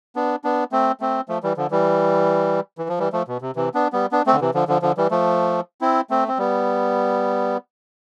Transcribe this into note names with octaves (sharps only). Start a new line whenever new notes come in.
B3 D4
B3 D4
A3 C4
A3 C4
F3 A3
E3 G3
D3 F3
E3 G3
E3
F3
E3 G3
F3 A3
B2
C3
C3 E3
B3 D4
G3 B3
B3 D4
A3 C4
D3
C3 E3
D3 F3
D3 F3
D3 F3
E3 G3
F3 A3
C4 E4
A3 C4
C4
G3 B3